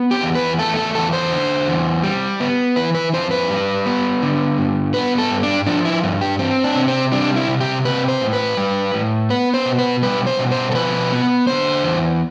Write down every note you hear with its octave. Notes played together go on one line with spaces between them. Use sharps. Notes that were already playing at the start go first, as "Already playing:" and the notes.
Already playing: B3
G4
E2
B4
A3 A4
A4
E2 A4
C5
D3
E2
G3
B3
E3 B4
B4
F2 C5
B4
G3
B3
D3
G2
B3 B4
A4
G2
D4
F3 D4
E4
G2
G4
C4
D4
C3
C4
G3 D4
E4
C3
G4
C4 B4
C5
A2
B4
G3
A2
B3 B4
C5
B2
B4
G3 B4
C5
B2
C5
A4
F3 B4
B3
D3 C5
E2